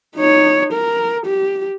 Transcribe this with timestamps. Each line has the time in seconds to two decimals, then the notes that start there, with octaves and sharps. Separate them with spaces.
0.16 D#4 C#5
0.73 A#4
1.26 G4